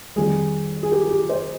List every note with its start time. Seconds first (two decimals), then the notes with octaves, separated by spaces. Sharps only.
0.16 F2 D#3 G3 G#4
0.83 G#4
0.91 G4 A#4
1.11 G4
1.29 C5 D#5